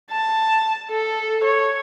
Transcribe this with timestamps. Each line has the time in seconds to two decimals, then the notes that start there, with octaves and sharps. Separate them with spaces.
0.11 A5
0.91 A4
1.44 C#5